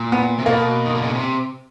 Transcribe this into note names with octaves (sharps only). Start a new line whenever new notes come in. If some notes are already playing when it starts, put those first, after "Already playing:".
Already playing: A#2
B3
C3
B2 A#3
D#3
D3
C#3
C3